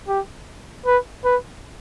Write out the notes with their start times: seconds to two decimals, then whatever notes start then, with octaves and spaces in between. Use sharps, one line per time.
0.08 G4
0.86 B4
1.25 B4